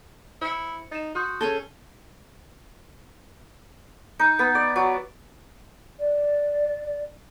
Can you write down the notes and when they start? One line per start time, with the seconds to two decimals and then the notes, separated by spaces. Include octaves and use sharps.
0.41 E4 C5 C#7
0.92 D#4 A6 E7
1.15 F#4 C6 D#6 G6
1.41 C#4 G#4 A4 A5 G6 G7
4.19 D#4
4.39 B3
4.55 D5
4.76 F#3
5.98 D5